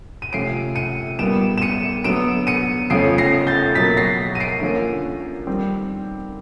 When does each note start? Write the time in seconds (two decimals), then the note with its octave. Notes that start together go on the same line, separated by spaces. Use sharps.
0.22 D#7
0.33 C3 F3 A3 C#4 C7 D7
0.76 C#7 D#7
1.19 A#2 G3 B3 D7 E7
1.58 E7
1.62 C#7 D#7
2.04 D3 F#3 B3 D7 E7
2.47 C#7 D#7
2.90 F2 C#3 F3 A3 C#4 C7 D7
3.18 A#6 C7
3.47 G6 A6
3.75 B2 F#3 A#3 A6 B6
3.97 A#6 C7
4.35 D#7
4.40 C7 D7
4.61 D3 F3 A#3 C#4
5.47 D#3 G3 C4